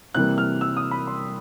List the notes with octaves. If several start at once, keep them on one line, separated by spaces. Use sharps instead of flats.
C3 E3 G3 A#3 F#6
F6
E6
D#6
B5
C6